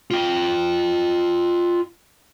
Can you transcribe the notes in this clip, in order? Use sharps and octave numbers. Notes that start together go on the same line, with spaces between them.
F4 G5